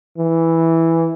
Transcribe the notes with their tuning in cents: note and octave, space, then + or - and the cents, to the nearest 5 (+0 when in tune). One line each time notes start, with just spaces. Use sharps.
E3 -5